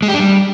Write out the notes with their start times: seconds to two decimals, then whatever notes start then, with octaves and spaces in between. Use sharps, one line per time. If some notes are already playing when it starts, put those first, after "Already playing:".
0.02 G#3
0.08 G4
0.14 D4
0.20 G3